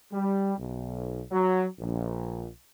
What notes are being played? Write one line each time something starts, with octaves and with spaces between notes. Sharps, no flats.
G3
B1
F#3
A#1